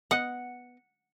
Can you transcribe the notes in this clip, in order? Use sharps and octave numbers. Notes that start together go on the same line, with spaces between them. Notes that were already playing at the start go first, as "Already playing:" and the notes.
B3 D#5 F#5